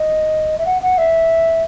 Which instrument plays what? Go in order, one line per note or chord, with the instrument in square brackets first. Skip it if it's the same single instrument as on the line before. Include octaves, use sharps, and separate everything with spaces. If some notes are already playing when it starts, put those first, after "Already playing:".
Already playing: [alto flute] D#5
E5
F#5
F#5
E5